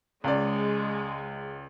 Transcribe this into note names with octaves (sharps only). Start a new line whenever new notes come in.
C#2 G#3 D5